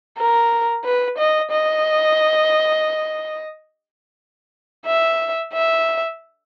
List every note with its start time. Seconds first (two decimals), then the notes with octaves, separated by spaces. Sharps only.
0.18 A#4
0.85 B4
1.18 D#5
1.51 D#5
4.86 E5
5.53 E5